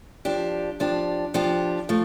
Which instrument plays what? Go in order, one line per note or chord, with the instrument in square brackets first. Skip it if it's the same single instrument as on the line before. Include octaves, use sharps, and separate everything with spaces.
[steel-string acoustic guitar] F3 D4 G4
F3 D4 G4
F3 D4 G4
F3 A3